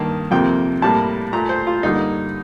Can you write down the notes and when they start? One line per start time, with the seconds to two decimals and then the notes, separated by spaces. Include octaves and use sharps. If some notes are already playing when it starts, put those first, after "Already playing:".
Already playing: G2 D#3 A#3 A5
0.31 F2 C3 F3 A#3 G5
0.82 A2 G3 A#3 A5
1.33 A#2 A3 A#5
1.49 C5
1.67 F4
1.83 G2 D3 G3 A#3 D#4